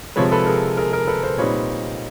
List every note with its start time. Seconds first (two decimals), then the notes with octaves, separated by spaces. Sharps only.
0.16 C3 F3 G#3 B4 C#5
0.32 A4 B4
0.46 G#4 A#4
0.77 G#4 A#4
0.92 G#4 A#4
1.07 A4 B4
1.23 A#4 C5
1.38 A#2 G3 C4 D#4 B4 C#5